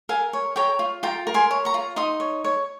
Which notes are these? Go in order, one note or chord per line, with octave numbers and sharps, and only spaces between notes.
A#4 F5 G#5
C#5
C#5 G5 A#5
F4
F4 G5 A#5
A#4
G#5 C6
C#5
A#5 C#6
F4
D#4 C6 D#6
C#5
C#5